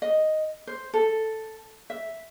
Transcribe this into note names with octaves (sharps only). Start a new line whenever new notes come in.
D#5
C5
A4
E5